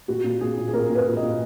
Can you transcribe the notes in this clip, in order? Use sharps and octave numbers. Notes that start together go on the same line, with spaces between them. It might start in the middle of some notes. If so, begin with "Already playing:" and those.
A#2 F#4
A#2
A#2 G#4
A#2
G#4
A#2 A#4
A#2
B4
A#2
D#5
A#2